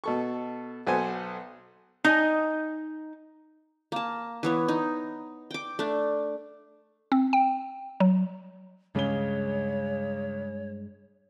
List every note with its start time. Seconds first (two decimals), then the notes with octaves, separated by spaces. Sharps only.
0.04 B2 A4 C#6
0.87 B1 B3 A4 C5 G#5
2.04 D#4 D#5 G#5
3.92 A#3 A5
4.43 E3 B3 C#5
4.68 D#4
5.51 G5 D6
5.79 A3 D4
7.12 C4
7.33 G5
8.00 F#3
8.95 C#2 G2 C#3 G#3 C#5 G7